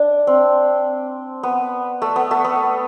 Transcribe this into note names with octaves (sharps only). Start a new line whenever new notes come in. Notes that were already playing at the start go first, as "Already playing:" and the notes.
Already playing: D4
C4
B3
A3
B3
A3
B3